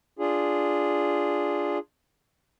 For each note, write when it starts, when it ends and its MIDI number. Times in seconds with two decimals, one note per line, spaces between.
0.19 1.78 62
0.19 1.78 65
0.19 1.78 68